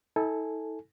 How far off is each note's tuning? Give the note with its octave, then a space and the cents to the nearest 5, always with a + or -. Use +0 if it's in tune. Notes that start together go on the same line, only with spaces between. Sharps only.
E4 -45 A4 +0 G#5 +0